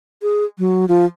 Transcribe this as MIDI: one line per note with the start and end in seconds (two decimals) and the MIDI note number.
0.22 0.45 68
0.58 0.85 54
0.89 1.05 53